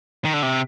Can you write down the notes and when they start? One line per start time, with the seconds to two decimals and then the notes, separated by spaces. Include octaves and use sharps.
0.25 D#3
0.34 D3
0.43 C3